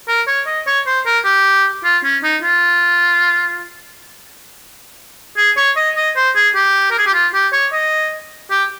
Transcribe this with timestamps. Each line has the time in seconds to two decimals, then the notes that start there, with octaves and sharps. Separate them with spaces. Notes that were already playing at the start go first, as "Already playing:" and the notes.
0.08 A#4
0.27 C#5
0.47 D#5
0.67 C#5
0.86 C5
1.05 A#4
1.25 G4
1.84 F4
2.04 C#4
2.23 D#4
2.43 F4
5.37 G#4
5.57 C#5
5.76 D#5
5.96 D#5
6.16 C5
6.36 G#4
6.55 G4
6.91 A#4
6.98 G#4
7.06 G4
7.14 F4
7.33 G4
7.52 C#5
7.73 D#5
8.50 G4